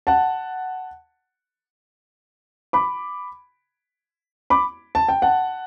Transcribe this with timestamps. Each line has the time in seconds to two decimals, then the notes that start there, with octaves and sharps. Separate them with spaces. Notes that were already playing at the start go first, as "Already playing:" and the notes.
0.07 F#5 A5
2.73 B5 D6
4.50 B5 D6
4.95 A5
5.08 G5
5.22 F#5 A5